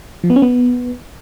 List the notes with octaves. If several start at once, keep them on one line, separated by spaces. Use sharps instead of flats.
F3
B3
C#4
B3